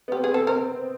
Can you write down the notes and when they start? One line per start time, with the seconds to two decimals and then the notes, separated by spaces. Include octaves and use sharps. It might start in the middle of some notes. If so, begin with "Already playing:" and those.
0.08 B3
0.12 C4 G4
0.24 B3 G#4
0.32 C4 A4
0.40 B3
0.47 C4 A#4
0.56 B3